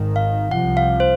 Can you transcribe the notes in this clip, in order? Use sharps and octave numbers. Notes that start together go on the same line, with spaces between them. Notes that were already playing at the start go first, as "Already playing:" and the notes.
Already playing: G#1 G#2 D#3
F5
C2 C3 F3 F#5
F5
C5